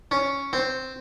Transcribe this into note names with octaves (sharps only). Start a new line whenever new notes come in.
C#4
C4